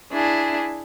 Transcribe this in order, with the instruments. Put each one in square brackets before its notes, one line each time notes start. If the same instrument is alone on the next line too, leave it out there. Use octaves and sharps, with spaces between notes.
[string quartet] D4 E4 G#4